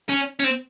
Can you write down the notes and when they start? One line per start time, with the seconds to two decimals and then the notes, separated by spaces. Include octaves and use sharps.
0.09 C#4
0.39 C#4
0.44 C4